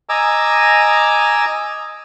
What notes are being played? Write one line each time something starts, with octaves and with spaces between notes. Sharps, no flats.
D#5 G#5 A#5 D6 E6